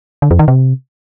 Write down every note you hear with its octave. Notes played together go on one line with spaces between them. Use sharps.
D3
F2
D#3
C3